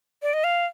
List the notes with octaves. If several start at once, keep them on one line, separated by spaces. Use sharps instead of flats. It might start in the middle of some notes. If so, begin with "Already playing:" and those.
D5
D#5
F5